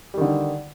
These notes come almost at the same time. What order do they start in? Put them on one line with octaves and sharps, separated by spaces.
G3 D#3 D3